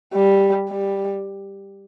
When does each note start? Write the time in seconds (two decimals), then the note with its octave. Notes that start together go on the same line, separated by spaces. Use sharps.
0.14 G3
0.70 G3